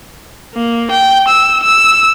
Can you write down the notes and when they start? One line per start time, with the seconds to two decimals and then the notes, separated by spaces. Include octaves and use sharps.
0.55 A#3
0.91 G5
1.28 E6
1.63 E6